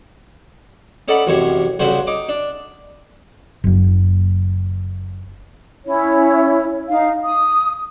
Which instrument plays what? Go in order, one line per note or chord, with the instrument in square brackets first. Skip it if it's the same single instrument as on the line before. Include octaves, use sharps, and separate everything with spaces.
[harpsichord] C#4 D#4 A4 D5 F#5 B5
A1 F#2 C3 C#5
B1 G2 C#3 F#3 C5
D#4 D6
D4
[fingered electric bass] F#1 F#2
[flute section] C#4 E4 C#5
D#4 F5
D#6